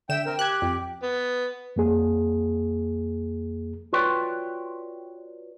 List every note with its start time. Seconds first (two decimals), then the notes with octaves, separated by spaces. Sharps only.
0.09 D3 E5 G5 E7
0.26 C4 A#4 G5
0.39 G4 F#6 G#6
0.62 F2
1.03 B3
1.76 F2 A#3 G#4
3.93 F4 F#4 B4 C#5 D5 G5